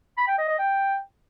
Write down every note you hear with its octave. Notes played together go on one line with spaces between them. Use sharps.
B5
G5
D#5
D#5
G5